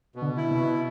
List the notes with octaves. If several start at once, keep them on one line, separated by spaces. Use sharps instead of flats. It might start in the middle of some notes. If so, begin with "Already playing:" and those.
B2
D3
E4
C3
B2